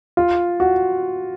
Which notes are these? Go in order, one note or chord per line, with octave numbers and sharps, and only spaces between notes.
F4
F#4